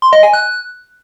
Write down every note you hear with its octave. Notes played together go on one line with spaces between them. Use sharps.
C6
D#5
G#5
F#6